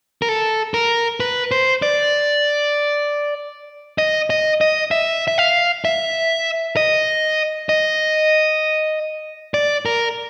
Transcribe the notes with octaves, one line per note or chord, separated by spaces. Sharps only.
A#4
A4
A#4
B4
C5
D5
D#5
D#5
D#5
E5
E5
F5
E5
D#5
D#5
D5
A#4